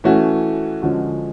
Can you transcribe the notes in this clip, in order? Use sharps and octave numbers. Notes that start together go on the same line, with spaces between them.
E3 A3 C#4 F#4
D3 F3 G#3 C#4 F#4